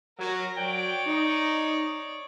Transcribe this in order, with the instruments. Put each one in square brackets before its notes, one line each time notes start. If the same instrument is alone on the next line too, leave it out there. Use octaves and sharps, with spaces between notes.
[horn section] F#3 [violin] A#4 A#6
[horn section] F#3 G5 [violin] C#5 D5
[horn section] D#4